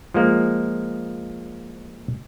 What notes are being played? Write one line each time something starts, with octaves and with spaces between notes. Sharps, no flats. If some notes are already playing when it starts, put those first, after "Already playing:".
F3 G#3 A#3